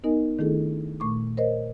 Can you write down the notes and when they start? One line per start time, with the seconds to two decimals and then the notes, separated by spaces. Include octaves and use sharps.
0.04 B3 D#4 A#4 D#5 G#5
0.39 D#3 A3 D4 E4 G#4 A4
1.00 A#2 A3 C#6 D6
1.37 A#4 C5 C#5 D#5